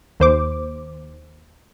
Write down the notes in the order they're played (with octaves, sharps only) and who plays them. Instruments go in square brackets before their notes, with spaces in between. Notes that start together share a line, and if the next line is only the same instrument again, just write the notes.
[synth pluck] D#2 C5 D6